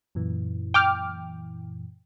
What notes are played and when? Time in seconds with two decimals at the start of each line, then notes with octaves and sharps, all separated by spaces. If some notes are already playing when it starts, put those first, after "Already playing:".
0.15 F#2 A#2 E3
0.74 G5 D6 F6